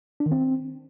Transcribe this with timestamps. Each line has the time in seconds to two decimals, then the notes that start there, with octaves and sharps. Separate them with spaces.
0.20 D4
0.26 D#3
0.32 C4